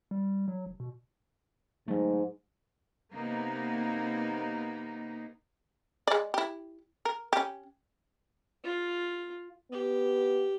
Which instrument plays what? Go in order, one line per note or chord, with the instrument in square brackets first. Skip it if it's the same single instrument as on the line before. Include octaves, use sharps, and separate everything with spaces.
[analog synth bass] G3
F#3
F1
B2
[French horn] G#2 [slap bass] F#3 A3
[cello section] C3 A#3 B3 D#4
[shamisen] G#3 D5
E4 G4
A#4
C#4 G4
[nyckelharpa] F4
[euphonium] B3 [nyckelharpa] G4